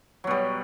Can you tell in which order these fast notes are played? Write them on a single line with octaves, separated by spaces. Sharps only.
F#3 B2 G3